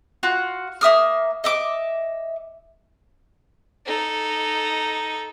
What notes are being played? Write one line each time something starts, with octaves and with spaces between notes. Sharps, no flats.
F4 F#4 F#5
A#3 E5 D#6 F6
D#5 E5 D6
D#4 A4